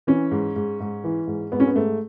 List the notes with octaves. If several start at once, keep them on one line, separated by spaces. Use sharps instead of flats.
E3 C#4
G#2
G#2
G#2
E3
G#2
G#2 B3
C#4
B3
G#2 A3